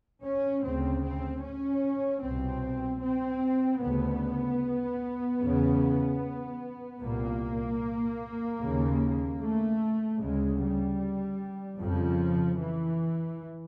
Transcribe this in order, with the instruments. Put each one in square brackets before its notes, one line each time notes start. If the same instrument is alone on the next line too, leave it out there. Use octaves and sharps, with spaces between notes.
[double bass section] C#4
D2 C#3 C4
C4
C#4
C2 B2 C4
C4
D2 C#3 B3
E2 C#3
C2 A#2 A#3
D#2 C#3
A3
D2 C#3 G#3
G3
F2 C#3 F3
E3